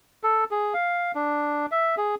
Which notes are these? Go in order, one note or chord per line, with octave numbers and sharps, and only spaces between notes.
A4
G#4
F5
D4
E5
G#4